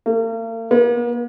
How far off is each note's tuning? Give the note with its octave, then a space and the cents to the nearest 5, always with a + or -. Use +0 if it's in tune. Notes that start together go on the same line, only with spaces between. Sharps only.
A#3 -45
A#3 +45